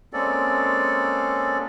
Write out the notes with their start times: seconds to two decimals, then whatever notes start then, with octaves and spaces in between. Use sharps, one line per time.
0.13 G#3 A#3 C4 C#4 A4 D5